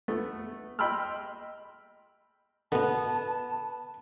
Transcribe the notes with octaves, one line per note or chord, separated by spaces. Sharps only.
A3 B3
D#5 G5 B5 C6 E6 F6
B2 D3 B3 A5